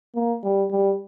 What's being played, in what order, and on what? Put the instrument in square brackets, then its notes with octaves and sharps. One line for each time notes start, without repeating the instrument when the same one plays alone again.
[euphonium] A#3
G3
G3